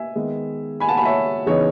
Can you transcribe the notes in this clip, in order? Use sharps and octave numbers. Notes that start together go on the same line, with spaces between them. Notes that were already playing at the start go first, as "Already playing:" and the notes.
Already playing: E5 G#5
D#3 G#3 B3
G#5 B5
F#5 A5
G#5 B5
C#5 E5
C#3 E3 B3 D#4 C#5